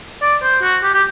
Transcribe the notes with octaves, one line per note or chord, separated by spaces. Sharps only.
D5
C5
F#4
G4
G4